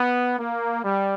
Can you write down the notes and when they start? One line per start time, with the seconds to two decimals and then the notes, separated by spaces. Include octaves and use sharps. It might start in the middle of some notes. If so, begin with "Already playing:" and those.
Already playing: B3
0.38 A#3
0.83 G3